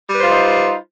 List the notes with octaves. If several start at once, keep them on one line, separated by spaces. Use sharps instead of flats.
G3 D#4 F4 B4 C5